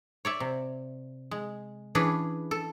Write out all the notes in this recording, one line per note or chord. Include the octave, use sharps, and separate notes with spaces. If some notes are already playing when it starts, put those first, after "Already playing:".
C#5 D5 E5
C3
G#3
E3 C#4 D4 G#4 B4
A4